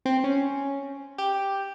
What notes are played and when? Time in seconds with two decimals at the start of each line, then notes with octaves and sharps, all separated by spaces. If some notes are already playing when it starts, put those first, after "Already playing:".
0.05 C4
0.24 C#4
1.18 G4